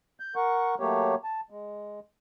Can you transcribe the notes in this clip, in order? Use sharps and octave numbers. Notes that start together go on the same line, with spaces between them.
G6
A#4 F#5 C#6
F#3 A3 A#3 G4 C#5
A5
G#3